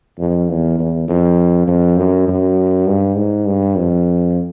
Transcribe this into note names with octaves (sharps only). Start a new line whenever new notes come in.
F2
E2
E2
F2
F2
F#2
F#2
G2
G#2
G2
F2